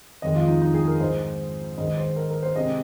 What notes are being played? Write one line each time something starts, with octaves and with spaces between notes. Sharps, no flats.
F2 D#3 G#3 D#5
F4
D#4
D#4
G#4
A#4
G#2 G#3 C5
G#2 D#3 G#3 D#5
C5
A#4
A#4
C5
C3 G#3 D#5